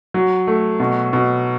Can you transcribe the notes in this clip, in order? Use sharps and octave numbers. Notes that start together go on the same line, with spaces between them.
F#3
A3
B2
B2